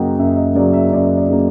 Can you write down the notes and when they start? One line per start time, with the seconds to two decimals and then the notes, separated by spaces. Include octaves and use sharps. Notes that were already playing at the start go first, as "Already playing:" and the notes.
Already playing: F#2 C#3 F#3 A#3 D#5 F#5 G5
0.19 F#2 E5
0.37 D#5
0.55 C#3 F#3 A#3 D5
0.73 E5
0.93 F#2 D5
1.17 D5
1.29 C#3 F#3 A#3